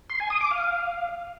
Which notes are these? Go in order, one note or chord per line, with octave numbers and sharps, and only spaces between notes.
C6
G#5
D#6
D6
F5